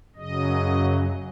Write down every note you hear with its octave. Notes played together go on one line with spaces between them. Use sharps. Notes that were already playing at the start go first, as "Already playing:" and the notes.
F#2 C#3 F#3 D#5